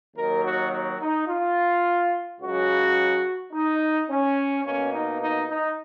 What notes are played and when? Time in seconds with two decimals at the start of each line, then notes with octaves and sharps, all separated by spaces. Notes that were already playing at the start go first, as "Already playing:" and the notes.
0.16 D#2 D#3 F#3 A#4
0.45 F#4
0.72 F#4
1.00 D#4
1.28 F4
2.41 C#2 C#3 F#3 F#4
3.52 D#4
4.09 C#4
4.64 B2 A#3 C#4
4.93 D#4
5.21 D#4
5.49 D#4